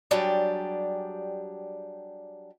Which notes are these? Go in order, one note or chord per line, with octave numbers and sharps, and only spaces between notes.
F#3 G3 D4 G4 G#4